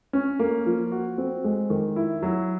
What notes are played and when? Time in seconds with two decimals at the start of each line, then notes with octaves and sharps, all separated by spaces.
0.13 C#4
0.39 A#3
0.66 F3
0.92 F#4
1.18 C4
1.44 G#3
1.70 D#3
1.96 E4
2.23 F#3